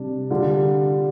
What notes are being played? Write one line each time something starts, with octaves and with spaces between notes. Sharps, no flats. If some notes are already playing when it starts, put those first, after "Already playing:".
Already playing: C3 G3 D4
D3 G3 F4